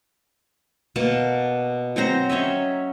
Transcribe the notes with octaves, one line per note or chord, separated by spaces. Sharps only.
B2 A#3 A5
F#3 C4 C5 A#5
C#4 C#5 D#5 E5